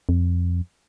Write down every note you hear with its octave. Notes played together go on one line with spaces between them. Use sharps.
F2